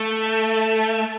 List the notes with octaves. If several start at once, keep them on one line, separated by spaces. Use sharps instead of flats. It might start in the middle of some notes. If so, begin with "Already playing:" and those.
Already playing: A3